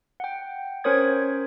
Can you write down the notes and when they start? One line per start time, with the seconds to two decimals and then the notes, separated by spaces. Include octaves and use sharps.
0.20 F#5 G5
0.84 C#4 A#4 C5 C#5 D#6 G#6